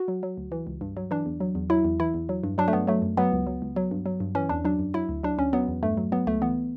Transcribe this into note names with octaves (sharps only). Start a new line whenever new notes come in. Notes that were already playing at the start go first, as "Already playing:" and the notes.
Already playing: F#4
F#3
F#3
D2
E3
C#2
G2
F#3
E3 D4
E2
F#3
E2
F#3 E4
E2
E3 E4
E2
F#3
G2
F#3 D4
A3
G2 B3
F#3 A3
F#2
F#3 B3
C#2
F#3
C#2
F#3
G2
F#3
G2
E3 C#4
E2 D4
F#3 D4
F#2
F#3 E4
D2
F#3 D4
D2 C#4
F#3 B3
E2
G2 A3
F#3
F#3 B3
C#2 A3
E3 B3